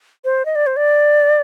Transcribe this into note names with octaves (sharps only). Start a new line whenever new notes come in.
C5
D#5
D5
C5
D5